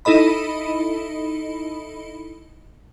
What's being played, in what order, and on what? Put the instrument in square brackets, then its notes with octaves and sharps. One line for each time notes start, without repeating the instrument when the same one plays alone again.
[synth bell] D#4 E4 A4 D#5 B5